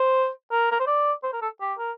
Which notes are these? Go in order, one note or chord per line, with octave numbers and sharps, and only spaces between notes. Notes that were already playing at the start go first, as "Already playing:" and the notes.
Already playing: C5
A#4
A#4
C5
D5
C5
A#4
A4
G4
A#4